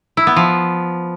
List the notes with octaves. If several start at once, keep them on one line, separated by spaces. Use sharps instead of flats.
E4
B3
F3